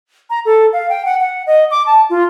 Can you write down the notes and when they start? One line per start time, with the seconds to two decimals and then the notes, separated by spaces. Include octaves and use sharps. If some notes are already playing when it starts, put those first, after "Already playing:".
0.30 A#5
0.45 A4
0.73 F5
0.90 G5
1.05 F#5
1.20 F#5
1.47 D#5
1.71 D6
1.86 A5
2.10 F4